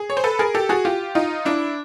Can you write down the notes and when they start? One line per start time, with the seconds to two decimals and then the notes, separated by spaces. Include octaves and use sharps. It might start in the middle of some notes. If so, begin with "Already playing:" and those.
Already playing: G#4
0.10 C#5
0.17 C5
0.24 A4 B4
0.39 G#4 A#4
0.55 G4 A4
0.69 F#4 G#4
0.85 F4 G4
1.15 D#4 F4
1.45 D4 E4